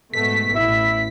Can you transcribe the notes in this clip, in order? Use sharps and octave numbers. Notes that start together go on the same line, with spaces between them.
G#2 B2 A3 B6
A1 E4 E5